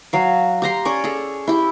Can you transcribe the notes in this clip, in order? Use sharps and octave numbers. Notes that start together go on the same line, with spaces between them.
F#3 F5
G4 A#5 C6
C#4 C#5 D5
G#4 A4
E4 G4